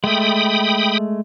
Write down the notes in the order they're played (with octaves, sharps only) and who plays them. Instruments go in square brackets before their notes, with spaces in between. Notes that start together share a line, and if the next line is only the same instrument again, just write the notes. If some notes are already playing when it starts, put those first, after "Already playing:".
[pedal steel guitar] G#3 A3 [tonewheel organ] G5 B5 D#6